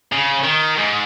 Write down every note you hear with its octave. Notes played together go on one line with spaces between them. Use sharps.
C#3
D#3
G#2